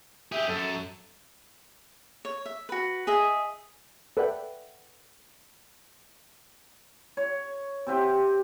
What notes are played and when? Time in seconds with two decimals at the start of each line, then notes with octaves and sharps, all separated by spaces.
0.32 G4 G#4 E5
0.48 F#2 A4
2.25 C#5
2.46 E5
2.69 F#4 B4
3.07 G#4 D#5 E5
4.17 A4 B4 D5 E5 F#5 G5
7.17 C#5
7.87 C3 C4 G4 C5